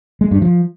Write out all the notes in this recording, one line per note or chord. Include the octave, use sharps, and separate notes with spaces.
G#3
G2
F3